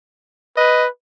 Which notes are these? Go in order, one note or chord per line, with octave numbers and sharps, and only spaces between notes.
B4 D#5